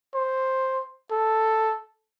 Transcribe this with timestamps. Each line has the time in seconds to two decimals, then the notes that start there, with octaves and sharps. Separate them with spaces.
0.14 C5
1.11 A4